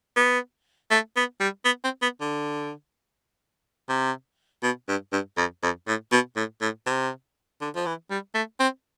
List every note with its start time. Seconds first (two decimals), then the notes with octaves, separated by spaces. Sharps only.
0.16 B3
0.91 A3
1.16 B3
1.40 G3
1.65 B3
1.84 C4
2.02 B3
2.21 D3
3.89 C3
4.63 B2
4.88 G2
5.12 G2
5.37 F2
5.62 F2
5.87 A2
6.12 B2
6.36 A2
6.62 A2
6.86 C3
7.61 D3
7.76 F3
7.86 E3
8.10 G3
8.35 A3
8.60 C4